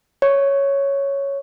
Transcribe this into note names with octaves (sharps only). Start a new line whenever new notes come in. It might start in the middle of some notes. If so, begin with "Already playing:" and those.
C#5